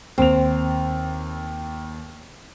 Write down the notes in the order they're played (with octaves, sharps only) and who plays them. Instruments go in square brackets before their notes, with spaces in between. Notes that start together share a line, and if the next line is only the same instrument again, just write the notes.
[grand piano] D#2 F7 [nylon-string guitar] C4